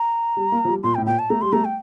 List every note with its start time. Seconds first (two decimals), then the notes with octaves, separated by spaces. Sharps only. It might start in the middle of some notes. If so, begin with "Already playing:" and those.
Already playing: A#5
0.37 G3
0.52 A#3
0.65 F3
0.68 G3
0.83 A#2 C6
0.95 G5
0.98 A2
1.06 A#2 G5
1.19 A5
1.30 A3 A#5
1.41 G3 C6
1.53 A3 A#5
1.65 G5